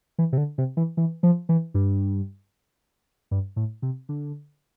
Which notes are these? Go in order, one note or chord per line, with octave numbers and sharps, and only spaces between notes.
E3
C3
D3
C3
E3
E3
F3
E3
G2
G2
A2
C3
D3